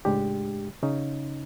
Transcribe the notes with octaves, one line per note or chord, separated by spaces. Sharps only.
C#2 A2 G#3 D4 G4
C#3 C#4 D#4